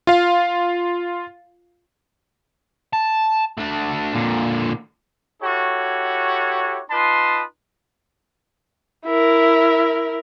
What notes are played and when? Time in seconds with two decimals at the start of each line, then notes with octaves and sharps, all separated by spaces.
0.07 F4 F5
2.93 A5
3.58 A3 D4
4.14 A#2 D3
5.42 E4 F#4 G4 A4 C#5
6.91 D#4 F4 B4 A5 C6 D#6
9.06 E4 A#4